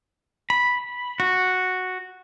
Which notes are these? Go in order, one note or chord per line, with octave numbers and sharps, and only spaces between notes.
B5
F#4